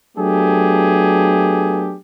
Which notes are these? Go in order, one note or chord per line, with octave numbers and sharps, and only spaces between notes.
F#3 A3 B3 D4 G4 G#4